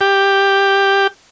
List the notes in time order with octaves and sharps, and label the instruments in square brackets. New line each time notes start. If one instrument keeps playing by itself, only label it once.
[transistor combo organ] G4